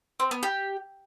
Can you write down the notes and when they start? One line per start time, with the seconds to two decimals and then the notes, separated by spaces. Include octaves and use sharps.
0.20 C4
0.31 B3
0.43 G4